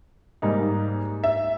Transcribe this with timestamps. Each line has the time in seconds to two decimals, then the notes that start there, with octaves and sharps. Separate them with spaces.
0.42 G#2 G3 A#3 D#4
1.24 E5